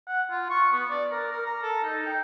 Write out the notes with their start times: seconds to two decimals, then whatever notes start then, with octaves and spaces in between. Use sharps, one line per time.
0.08 F#5
0.31 F4
0.50 C#6
0.73 B3
0.90 D5
1.12 A#4
1.32 A#4
1.46 A#5
1.63 A4
1.84 D#4
2.06 G5